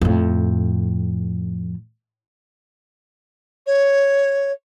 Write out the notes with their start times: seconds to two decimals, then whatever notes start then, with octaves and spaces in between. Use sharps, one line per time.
0.01 F2 A2
3.66 C#5